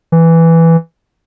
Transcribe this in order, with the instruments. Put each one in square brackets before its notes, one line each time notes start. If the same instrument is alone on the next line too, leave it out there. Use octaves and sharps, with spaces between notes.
[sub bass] E3